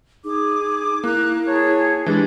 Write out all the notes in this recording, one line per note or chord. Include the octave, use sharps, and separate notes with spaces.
D#4 G#4 D6
A#3 E4 A#5 F#6
G#4 C#5 A5
E3 G#3 D4 G4